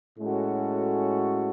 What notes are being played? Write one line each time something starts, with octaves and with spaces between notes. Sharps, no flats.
A2 G#3 C#4 F#4 A4